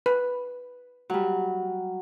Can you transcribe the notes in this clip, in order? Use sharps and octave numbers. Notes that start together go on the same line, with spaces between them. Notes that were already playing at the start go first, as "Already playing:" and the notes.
B4
F#3 G3